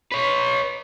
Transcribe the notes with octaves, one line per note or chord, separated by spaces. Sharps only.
B4 C#5